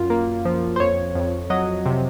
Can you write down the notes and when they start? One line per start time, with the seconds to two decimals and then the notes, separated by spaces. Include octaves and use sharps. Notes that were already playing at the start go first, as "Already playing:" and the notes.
Already playing: F#2 F4
0.10 A#3
0.45 F3
0.76 C5
0.80 F2 C#5
1.15 F2
1.50 F#3 D#5
1.86 C3